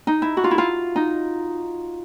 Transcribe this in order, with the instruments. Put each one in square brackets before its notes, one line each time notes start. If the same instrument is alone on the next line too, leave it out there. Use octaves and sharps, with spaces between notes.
[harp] D#4
E4
F#4
F4
E4
F4
D#4